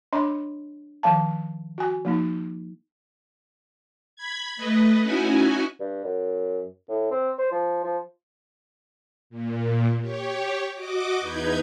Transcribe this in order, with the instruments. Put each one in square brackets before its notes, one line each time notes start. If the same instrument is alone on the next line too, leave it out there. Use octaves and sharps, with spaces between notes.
[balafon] D4 C#5 D#5 B5 C6 D6
D#3 F3 F5 A5
F#4 G#5
F3 A#3 D#4
[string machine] B5 G#6
A3 B4 D#5
C#4 D#4 E4 F#4 G#5
[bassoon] G2
F#2
A2
C4
C5
F3
F3
[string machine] A#2
G4 C#5
F#4 D#5 D6
E2 D#4 B4 G6 G#6